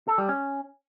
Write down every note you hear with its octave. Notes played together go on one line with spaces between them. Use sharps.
A4
G3
C#4